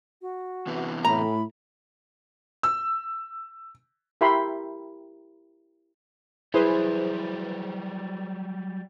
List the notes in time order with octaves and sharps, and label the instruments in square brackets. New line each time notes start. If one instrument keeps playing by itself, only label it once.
[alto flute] F#4
[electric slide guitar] C3 E3 B3
[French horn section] A2 [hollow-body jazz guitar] A#5 [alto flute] B5
[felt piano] E6
[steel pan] E4 G4 A#4 E5 B5 C6
[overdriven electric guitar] F#3 G3 [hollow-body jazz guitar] E4 [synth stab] G#4 B4 C5